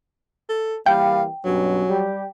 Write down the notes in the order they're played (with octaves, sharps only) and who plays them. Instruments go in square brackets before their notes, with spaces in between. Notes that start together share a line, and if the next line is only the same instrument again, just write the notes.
[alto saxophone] A4
[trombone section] E3 G3 A#3 [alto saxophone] F5 [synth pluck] G5
[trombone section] B1 G2 C#4 [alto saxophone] F#3
[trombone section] G3 G4